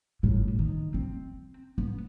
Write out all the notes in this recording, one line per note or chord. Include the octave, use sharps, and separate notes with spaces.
G1 A2
D#3
C4
B3